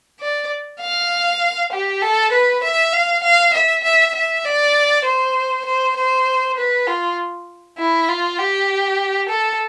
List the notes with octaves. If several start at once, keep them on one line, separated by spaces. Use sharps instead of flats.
D5
F5
G4
A4
B4
E5
F5
F5
E5
E5
E5
D5
C5
C5
C5
B4
F4
E4
F4
G4
A4